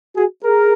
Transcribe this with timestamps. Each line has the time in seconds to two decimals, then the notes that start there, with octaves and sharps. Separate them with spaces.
0.16 F#4 G#4
0.45 G#4 A#4